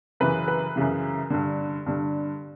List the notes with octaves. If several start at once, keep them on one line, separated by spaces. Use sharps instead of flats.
F#2 C#3 E3 B4
B4
F#2 C#3 E3
G2 D3
G2 D3